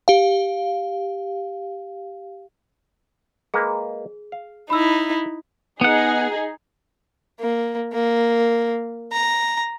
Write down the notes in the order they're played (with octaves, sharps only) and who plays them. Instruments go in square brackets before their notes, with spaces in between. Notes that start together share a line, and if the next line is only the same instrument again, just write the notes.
[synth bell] G4 F5
[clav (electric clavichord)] G#3 A#3 B4 [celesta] G#4
[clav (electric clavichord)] F5
[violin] D#4 E4 [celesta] B5 E6
[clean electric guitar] B3 F#5 [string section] D#4 G#4
[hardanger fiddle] A#3
A#3
A#5